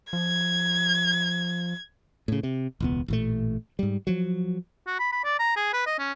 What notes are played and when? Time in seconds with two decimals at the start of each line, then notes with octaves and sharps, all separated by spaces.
0.13 F3 G#6
2.28 A2 C#3
2.43 C3
2.80 E1 C#2 B3
3.08 A1 A#2 A3
3.79 G#2 G3
4.07 F3 F#3
4.87 F#4
4.99 B5
5.12 B5
5.24 D5
5.39 A#5
5.56 G#4
5.73 B4
5.86 D#5
5.99 C#4